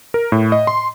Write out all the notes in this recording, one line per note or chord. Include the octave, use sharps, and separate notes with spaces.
A#4
A2
D#5
C6